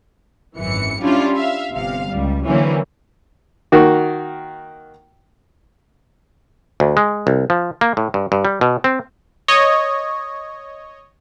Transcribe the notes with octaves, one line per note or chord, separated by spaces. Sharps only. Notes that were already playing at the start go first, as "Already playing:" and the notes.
G#1 F#2 E3 C#7
G3 C#4 D4 E4 F4
E5 F5
G1 C3 F5
C#2 G3
D3 E3 F#3 A#3 C4 C#4
D#3 A#3 F#4
D2
G#3
C2
F3
A#3
A2
G2
G2
G3
B2
C4
C#5 D#5